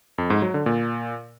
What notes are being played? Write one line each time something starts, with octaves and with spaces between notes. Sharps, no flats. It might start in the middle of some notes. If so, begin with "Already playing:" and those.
F2
G#2
F#3
D3
A#2